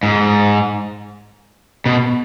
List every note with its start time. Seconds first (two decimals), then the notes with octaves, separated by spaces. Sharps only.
0.03 G#2
1.86 B2